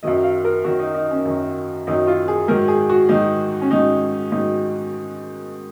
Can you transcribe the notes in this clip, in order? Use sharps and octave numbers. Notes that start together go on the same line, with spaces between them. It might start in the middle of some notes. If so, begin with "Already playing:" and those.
F#2 D#3 F#3 D#5
F5
A#4
F#2 D#3 F#3 F#4
D#4
D#4
C#4
F#2 D#3 F#3
F#2 D#3 F#3 D#4
F4
G#4
G#2 D#3 F#3 A#4
G#4
F#4
G#2 D#3 F#3 D#4
C#4
G#2 D#3 F#3 D#4
G#2 D#3 F#3 D#4